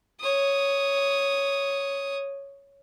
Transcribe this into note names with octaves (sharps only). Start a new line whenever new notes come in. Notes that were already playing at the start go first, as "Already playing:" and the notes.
C#5 D#6